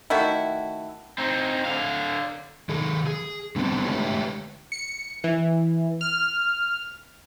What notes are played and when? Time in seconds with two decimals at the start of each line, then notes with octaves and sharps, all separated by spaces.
0.10 D#3 A3 E4 F#4
1.18 C4 D#4
1.65 D3 F5
2.69 D#3 G#4 A4
3.07 G#4
3.56 D3 G3 B3 C4 D4
3.84 D3 G#3 A3 G4 B4 C#5
4.72 C#7
5.24 E3
6.01 F6